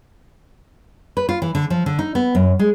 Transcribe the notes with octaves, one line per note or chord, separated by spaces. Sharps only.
B4
F4
E3
D3
F3
D3
D#4
B3
F#2
G#3